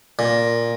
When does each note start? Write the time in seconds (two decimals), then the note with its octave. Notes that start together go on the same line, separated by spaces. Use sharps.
0.19 A#2